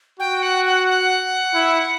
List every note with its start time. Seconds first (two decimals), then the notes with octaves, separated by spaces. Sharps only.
0.20 F#4 G5
0.42 F#5
0.65 F#5
0.88 F#5
1.54 E4